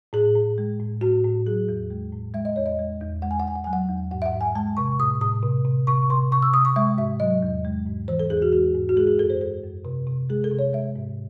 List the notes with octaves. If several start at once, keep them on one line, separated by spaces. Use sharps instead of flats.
A2 G#4
A2
G#3
A2
A2 F#4
A2
F#3 G#4
E2
G#3
A2
G#3 E5
D#5
E2 C#5
D#5
G#3
E2
G#3 F#5
G#5
F#5
E2 G#5
F#5
F#3 G#5
F#5
E2
G#2 F#5
E5
F#5
G#2
G#5
G#3 A5
C3 C#6
A2 D#6
A2 D#6
C3
C3
C3 C#6
C3 C6
C3 C#6
E6
C3 D#6
C#6
G#3 E5
G#2 E5
F#3 D#5
E2
G#3
G#2
E3 C5
A4
E2 G#4
F#4
G#3 F#4
G#2
F#4
G#3 G#4
G#4
F#2 A4
C5
G#3 A4
F#2
C3
C3
G#3 G#4
A4
C3
C#5
G#3 E5
G#2